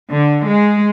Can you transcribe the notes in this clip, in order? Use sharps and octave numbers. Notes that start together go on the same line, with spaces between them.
D3
G#3